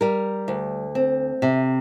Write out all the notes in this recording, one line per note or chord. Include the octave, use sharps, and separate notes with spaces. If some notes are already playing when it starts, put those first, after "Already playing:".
G3 A#4
D2
C4
C3